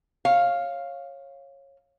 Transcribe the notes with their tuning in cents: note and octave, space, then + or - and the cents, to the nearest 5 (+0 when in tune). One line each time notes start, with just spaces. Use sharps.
C#5 -15 F5 +0